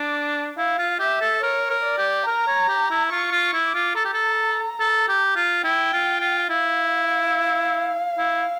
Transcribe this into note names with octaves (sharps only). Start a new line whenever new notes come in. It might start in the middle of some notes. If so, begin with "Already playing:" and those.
Already playing: D4 D6
E4 F5
F4
G4 E5
A4
A#4 C#5
A#4
D5
G4
A#4 A#5
C#5
G4
E4
F4 C#6
F4
C#6
E4
D6
F4
A4 A#5
G4
A4
A4
G4
F4
E4 G5
F4
F4
E4 F5
E4